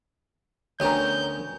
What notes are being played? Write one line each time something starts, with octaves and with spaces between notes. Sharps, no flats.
D2 B3 C#4 A#4 C#5 G5 G#5 G6